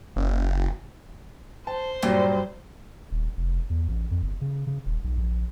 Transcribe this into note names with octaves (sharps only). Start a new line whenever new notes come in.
F#1
C5 A5
G2 A#2 F#3
D#1
F1
E2
A1
F2
G1
C#3
C#3
D#1
B1
A#1